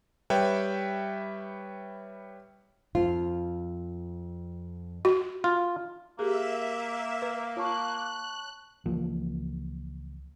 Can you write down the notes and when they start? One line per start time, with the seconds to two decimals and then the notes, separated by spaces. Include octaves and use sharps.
0.30 G3 B4 C#5 E5 G5
2.95 F2 F4
5.05 F#4
5.44 F4
6.19 A#3 G4 G#4 A#4 E5
7.22 B4
7.57 F4 C#5 A5 C#6 F#6
8.86 C#2 E3 F3 A#3